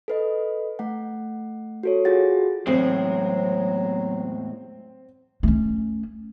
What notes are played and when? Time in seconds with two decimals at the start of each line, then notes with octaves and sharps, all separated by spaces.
0.08 A4 B4 D#5
0.79 A3 F#5
1.83 F#4 A4 C#5
2.05 F4 F#4 G#4 F#5 A6
2.67 E2 A2 F#3 G#3 C4
5.43 A3 C#4